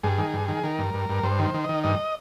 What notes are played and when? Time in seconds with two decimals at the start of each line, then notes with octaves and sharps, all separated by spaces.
0.03 G2 G#4
0.18 D#3
0.34 G2
0.48 D#3
0.64 D#3 A#4
0.79 G2
0.94 G2
1.09 G2
1.23 G2 C5
1.39 D#3
1.45 C5
1.54 D#3
1.64 D#3 D#5
1.84 G2 D#5